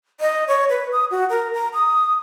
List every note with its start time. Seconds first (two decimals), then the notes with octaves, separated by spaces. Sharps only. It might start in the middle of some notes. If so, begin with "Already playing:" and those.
0.21 D#5
0.48 C#5
0.69 B4
0.92 D#6
1.11 F#4
1.30 A#4
1.54 A#5
1.74 D#6